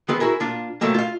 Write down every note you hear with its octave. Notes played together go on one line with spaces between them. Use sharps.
D#3 B3 C4 G#4 B4
E4 F#4 G#4 A#4
A#2 D4 F4
A2 C3 F#3 A3 A#3
F4 F5